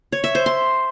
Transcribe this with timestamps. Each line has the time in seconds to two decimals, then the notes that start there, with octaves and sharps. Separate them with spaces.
0.12 C#5
0.24 E5
0.35 C5
0.46 C6